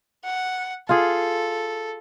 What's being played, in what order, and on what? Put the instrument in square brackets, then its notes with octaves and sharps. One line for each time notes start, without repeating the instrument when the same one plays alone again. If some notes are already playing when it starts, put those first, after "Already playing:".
[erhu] F#5
[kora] F4 G#4 [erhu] A4